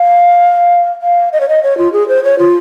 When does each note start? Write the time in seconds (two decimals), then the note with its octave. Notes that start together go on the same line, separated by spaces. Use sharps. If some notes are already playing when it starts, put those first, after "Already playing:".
Already playing: F5
1.02 F5
1.33 D#5
1.40 C#5
1.49 D#5
1.63 C#5
1.78 F4
1.93 G#4
2.08 C5
2.24 C#5
2.39 F4